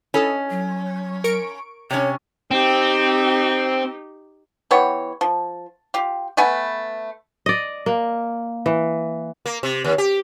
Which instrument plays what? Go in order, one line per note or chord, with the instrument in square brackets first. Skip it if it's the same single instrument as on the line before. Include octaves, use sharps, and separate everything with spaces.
[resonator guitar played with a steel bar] C#4 [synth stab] E4 A4 D#5
[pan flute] F#3
[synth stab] A#4 C#6 D7
[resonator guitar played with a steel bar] C3 C#4 [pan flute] C#5
[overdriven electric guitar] C4 [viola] D#4 G4
[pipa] E3 B3 G4 C#5
F3
F4 G4
A3 B3 B4 G#5
[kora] D5 D#5
A#3
E3
[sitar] A#3
C3
D#2
G4